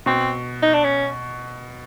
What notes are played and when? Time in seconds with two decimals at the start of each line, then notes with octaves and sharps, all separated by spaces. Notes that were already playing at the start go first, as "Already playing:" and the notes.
0.06 B2 C4
0.62 D#4
0.74 D4
0.84 C#4